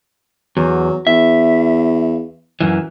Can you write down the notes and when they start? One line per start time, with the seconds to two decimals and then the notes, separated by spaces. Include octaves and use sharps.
0.57 E2 F#3
1.07 E2 E5
2.60 F#2 E3